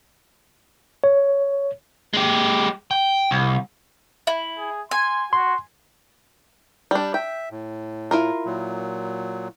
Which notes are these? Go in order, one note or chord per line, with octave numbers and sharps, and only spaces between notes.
C#5
G#3 G4
G5
C2
E4
G#4
G#5 C6
F#4 C6
G3 D4
E5 G5
A2
E4 F4 A#4
A#2 F#3